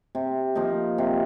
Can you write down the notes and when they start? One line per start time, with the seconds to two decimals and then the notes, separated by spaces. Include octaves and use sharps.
0.15 C3
0.55 F3 A#3 D#4
0.98 C3